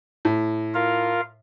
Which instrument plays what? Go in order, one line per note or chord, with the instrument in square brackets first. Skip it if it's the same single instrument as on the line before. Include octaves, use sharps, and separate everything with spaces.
[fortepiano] A2
[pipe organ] F4 A#4 F5